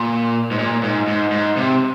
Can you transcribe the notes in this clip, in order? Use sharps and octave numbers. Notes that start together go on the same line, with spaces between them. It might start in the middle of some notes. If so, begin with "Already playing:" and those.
Already playing: A#2
G#2
A#2
G#2
G#2
G#2
C3